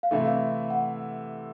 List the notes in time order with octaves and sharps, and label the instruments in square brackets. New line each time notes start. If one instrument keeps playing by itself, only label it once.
[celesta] F5
[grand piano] C3 E3 A3 [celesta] E5
[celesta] F5
F#5